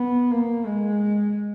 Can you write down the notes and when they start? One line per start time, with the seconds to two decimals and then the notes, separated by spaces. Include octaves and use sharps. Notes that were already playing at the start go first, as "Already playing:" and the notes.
Already playing: B3
0.31 A#3
0.66 G#3